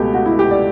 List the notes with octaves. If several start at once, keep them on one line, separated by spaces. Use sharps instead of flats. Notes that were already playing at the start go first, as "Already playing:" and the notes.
Already playing: C#2 B2 A3 G4
F#4
E4
G4
D5